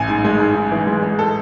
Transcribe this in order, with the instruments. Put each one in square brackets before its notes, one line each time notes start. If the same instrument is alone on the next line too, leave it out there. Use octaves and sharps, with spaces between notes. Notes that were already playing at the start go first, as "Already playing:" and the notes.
Already playing: [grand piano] A1 G#5
G#2
G#3
G#2
G#2
E3
G#3
G#3
A4